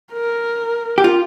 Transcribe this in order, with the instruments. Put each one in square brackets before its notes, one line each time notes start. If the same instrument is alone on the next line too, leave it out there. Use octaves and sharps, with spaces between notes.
[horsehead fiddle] A#4
[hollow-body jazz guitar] G4
F4